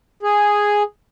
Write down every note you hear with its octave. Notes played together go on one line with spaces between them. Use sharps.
G#4